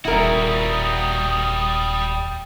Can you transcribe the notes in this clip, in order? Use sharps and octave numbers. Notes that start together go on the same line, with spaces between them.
D#1 G3 E4 F#4 A#4 D#6